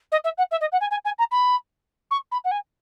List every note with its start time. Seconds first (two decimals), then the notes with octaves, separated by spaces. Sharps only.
0.12 D#5
0.24 E5
0.38 F#5
0.51 E5
0.61 D#5
0.72 F#5
0.81 G#5
0.91 G#5
1.05 G#5
1.18 A#5
1.31 B5
2.11 C#6
2.32 B5
2.45 F#5
2.51 G#5